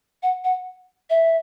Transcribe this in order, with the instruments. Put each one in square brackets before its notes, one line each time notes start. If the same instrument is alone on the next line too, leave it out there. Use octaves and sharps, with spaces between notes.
[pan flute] F#5
F#5
E5